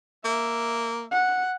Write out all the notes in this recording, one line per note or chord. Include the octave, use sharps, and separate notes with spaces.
A#3 E5
F#5